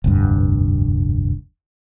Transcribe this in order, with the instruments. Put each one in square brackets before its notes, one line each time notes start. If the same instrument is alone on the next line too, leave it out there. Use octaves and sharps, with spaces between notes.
[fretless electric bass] F1 D2 G2